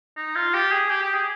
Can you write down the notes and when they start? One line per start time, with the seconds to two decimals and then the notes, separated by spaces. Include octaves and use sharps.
0.17 D#4
0.36 F4
0.54 G4
0.71 G#4
0.90 G4
1.02 G4
1.14 G#4